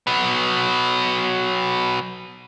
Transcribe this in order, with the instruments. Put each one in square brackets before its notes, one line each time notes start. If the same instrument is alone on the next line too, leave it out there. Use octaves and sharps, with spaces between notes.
[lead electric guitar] F#3 B3